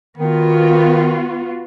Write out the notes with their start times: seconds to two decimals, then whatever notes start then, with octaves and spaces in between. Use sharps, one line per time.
0.18 D#3 B3 F4 F#4